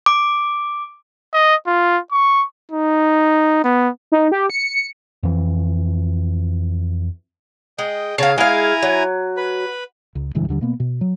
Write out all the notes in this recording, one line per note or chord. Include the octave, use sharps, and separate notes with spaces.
D6
D#5
F4
C#6
D#4
B3
D#4
G4
C#7
F2 E3
G#3 D#5 G5
C#3 C#5 F5 A5 A#5
G#3 E4 F5 G#5 A#5
F#3
B4 B5
C#2
D1 C#2 G2 E3
D#2 D3 G3
B2 A#3 B3
B2
F#3